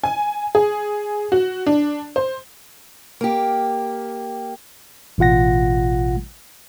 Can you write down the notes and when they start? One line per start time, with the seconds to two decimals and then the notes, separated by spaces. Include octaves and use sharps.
0.03 G#5
0.55 G#4
1.32 F#4
1.66 D4
2.16 C5
3.21 A#3 G4
5.18 A1 B2 F4 F#5 A#6